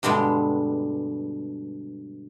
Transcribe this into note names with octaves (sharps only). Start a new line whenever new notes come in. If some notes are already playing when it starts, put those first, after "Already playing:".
G2 B2 D3 G3 G#3